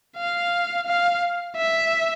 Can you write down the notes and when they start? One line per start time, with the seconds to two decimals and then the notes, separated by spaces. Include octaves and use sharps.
0.17 F5
0.87 F5
1.57 E5